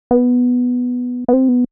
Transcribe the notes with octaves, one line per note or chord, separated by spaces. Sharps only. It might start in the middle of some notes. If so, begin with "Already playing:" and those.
B3
B3
C4
B3